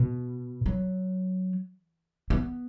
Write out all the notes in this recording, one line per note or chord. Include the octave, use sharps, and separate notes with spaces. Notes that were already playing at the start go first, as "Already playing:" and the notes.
Already playing: B2
F#3
B3